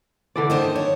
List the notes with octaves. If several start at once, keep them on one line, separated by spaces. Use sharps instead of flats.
D3 E3 D5
D#3 D4 C5 D#5
C#5